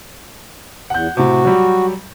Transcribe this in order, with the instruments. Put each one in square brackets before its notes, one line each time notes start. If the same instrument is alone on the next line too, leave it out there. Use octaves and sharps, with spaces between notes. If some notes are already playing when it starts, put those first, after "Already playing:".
[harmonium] E2 [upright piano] F#5 G6
[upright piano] A2 C3 [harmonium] F#4
[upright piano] F#3 G3